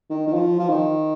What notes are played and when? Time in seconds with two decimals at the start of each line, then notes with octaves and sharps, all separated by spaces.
0.10 D#3
0.27 D#3
0.34 F3
0.59 F3
0.69 D#3